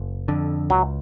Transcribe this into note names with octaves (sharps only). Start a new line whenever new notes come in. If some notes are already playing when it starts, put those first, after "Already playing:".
Already playing: F#1
F2 D3
C#2 F#3